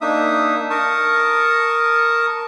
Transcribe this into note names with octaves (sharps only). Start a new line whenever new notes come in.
A#3 D4 D#4 E5 D#6
A#4 A5 C#6 D#6